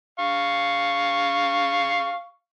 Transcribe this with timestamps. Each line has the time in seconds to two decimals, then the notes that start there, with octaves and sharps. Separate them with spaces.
0.19 F5 C#6